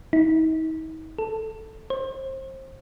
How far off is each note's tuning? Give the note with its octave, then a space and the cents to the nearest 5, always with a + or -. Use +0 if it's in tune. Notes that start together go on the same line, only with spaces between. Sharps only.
D#4 +40
A4 +0
C5 +30